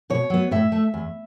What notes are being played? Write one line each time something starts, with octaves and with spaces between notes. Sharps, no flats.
B2 C#5
F#3 B3
A2 E5
A3
E2